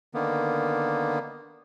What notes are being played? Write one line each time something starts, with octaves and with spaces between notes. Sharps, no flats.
D3 D#3 A#3 B3